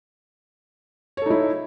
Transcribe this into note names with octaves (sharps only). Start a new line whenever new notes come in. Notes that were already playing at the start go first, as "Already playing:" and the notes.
D#4 E4 A4 C#5